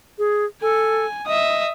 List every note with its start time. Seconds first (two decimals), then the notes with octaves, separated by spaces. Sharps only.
0.18 G#4
0.62 A4 G#5
1.27 D#5 E5 D#6